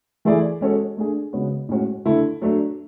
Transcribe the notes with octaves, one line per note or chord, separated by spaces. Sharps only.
E3 A3 E4 G#4 D5
G#3 C#4 F#4 A4
A3 D4 G#4
C#3 G#3 B3 F#4 C#5
A2 G#3 C#4 F#4
D3 A3 E4 A4
F#3 A3 D4